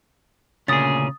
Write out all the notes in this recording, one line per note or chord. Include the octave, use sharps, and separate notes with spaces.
D2 A#2 C#3 C#4 G#4 D#6 A6